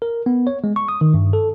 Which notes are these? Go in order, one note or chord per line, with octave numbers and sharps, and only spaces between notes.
A#4
B3
C#5
G#3
C#6
D#6
D#3
G2
A4